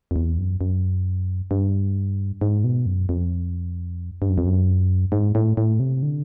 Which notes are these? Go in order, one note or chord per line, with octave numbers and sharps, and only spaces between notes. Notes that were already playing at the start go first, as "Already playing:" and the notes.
F2
E2
F#2
F#2
G2
G#2
B2
F#2
F2
G2
F#2
F2
F#2
G#2
A2
A2
C3
D3